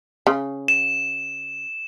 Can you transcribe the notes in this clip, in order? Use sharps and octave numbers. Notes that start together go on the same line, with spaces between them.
C#3
E7